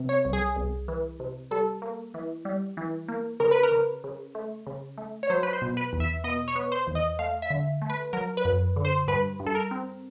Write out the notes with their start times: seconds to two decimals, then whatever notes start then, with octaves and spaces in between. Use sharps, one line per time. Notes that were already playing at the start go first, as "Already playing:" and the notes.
Already playing: C3
0.09 C#5
0.25 C2
0.33 G#4
0.56 C2
0.88 E3
1.20 C3
1.51 G3 A4
1.82 A#3
2.14 E3
2.45 G3
2.77 E3
3.08 A#3
3.40 C#3 A#4
3.51 B4
3.63 A#4
3.72 C#3
4.04 C#3
4.35 A3
4.67 C#3
4.98 A3
5.23 C#5
5.30 F#3 C5
5.43 B4
5.53 C5
5.62 B2
5.77 B4
5.93 E2
6.00 E5
6.24 B2 D#5
6.48 C#5
6.56 B3
6.72 C5
6.87 E2
6.95 D#5
7.19 A3 F5
7.42 E5
7.50 D3
7.82 A3
7.90 B4
8.13 F#3 A#4
8.37 B4
8.45 F#2
8.76 D3
8.85 C5
9.08 G2 B4
9.39 G2
9.47 A4
9.55 A#4
9.71 C4